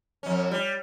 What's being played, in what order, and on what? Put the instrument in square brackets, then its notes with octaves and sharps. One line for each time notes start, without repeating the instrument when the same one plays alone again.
[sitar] F2 C#4
G3